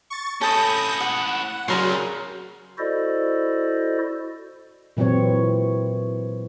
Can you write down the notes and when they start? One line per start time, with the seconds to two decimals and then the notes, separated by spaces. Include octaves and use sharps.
0.10 C#6 A6
0.41 C#4 E4 A4 G#5 B5 D#6 G6 A#6
1.00 F#5 D#6
1.68 C#3 F#3 G3 G#4 A#4 C6
2.78 E4 F#4 A4 C5 D5 D#5
4.97 A#2 E3 F#3 C4 C#5